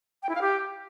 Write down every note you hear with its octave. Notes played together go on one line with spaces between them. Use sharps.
G5
E4
F5
G4